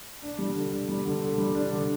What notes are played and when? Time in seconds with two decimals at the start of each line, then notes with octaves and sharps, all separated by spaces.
0.22 D4
0.38 G3
0.56 D3
0.72 D4
0.89 G3
1.05 D3
1.22 D3
1.38 G3
1.55 D4
1.72 D3